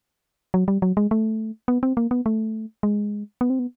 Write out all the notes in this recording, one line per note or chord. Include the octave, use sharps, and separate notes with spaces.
F#3
G3
F#3
G#3
A3
B3
C4
A#3
B3
A3
G#3
B3
C4
B3